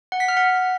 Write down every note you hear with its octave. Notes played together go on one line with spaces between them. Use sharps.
F#5
B6
F6
F#5